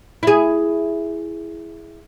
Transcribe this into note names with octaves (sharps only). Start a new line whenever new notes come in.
E4 G#4